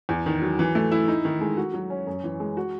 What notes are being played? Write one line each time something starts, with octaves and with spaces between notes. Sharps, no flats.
E2
D#3
F#3
E3
A3
E4
D#4
D#3
G#3
F#4
F#3
C#4
F#2
E3
G#3
F#4